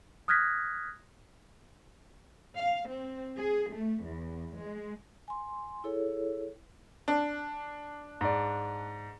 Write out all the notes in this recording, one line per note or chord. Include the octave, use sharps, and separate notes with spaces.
D#6 F6 F#6 G#6 A#6 B6
F5
C4
G#4
A3
E2
G#3
G#5 C6
E4 G#4 A4 C#5
D4
G#2 D5